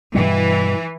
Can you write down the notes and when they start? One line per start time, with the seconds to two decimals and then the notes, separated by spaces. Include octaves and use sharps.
0.14 G2 B2 E3 G3